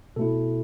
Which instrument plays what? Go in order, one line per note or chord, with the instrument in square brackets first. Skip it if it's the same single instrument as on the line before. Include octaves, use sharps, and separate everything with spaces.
[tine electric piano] B2 A3 E4 A4